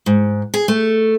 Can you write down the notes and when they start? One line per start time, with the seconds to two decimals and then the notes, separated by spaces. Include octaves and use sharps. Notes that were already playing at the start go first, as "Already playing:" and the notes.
0.06 G#2
0.54 G#4
0.68 A3